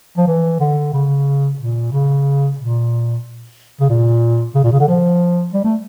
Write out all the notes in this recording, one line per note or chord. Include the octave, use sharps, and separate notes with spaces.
F3
E3
D3
C#3
A#2
C#3
A#2
C#3
A#2
C#3
A#2
C#3
D3
F3
G3
A3